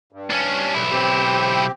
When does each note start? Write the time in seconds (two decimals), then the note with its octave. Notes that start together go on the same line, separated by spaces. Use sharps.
0.12 G2
0.30 C#4 D4
0.75 B1 E4
0.92 C4 G4